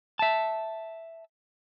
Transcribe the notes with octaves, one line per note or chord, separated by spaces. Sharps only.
E5 A5